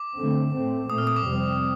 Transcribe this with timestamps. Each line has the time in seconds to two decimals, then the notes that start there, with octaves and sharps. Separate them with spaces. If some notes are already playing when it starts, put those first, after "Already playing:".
Already playing: D6
0.17 D3 A3 C4
0.53 A2 A3 C4
0.89 A#2 A3 C4 D#6
0.98 F6
1.07 D#6
1.16 D6
1.25 F2 C3 G3 C4